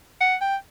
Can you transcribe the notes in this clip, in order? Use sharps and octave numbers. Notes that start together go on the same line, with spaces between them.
F#5
G5